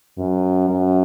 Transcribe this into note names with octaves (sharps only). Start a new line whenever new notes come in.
F#2
F#2